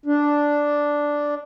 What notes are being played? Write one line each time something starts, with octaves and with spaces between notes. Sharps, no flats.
D4